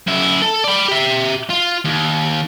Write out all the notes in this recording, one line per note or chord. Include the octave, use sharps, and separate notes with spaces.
F#2 E4
A4
D5 B5
G4 E5
F4
D#2